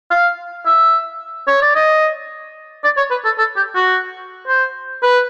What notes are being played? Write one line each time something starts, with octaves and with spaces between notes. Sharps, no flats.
F5
E5
C#5
D5
D#5
D5
C#5
B4
A4
A4
G4
F#4
C5
B4